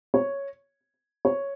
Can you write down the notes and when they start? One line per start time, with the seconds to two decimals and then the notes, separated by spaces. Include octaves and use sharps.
0.14 C#5
1.25 C#5